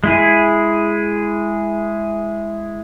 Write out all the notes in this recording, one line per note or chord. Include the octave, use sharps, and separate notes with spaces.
G#3 E4 G#4